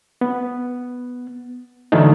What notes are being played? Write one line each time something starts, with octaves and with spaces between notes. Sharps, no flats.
B3
D3 E3 F#3 A3 D#4